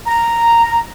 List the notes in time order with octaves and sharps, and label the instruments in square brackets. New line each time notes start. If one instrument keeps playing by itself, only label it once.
[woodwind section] A#5